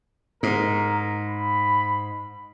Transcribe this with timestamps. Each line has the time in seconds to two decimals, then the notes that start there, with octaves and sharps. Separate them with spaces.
0.43 G#2 A#4
1.26 B5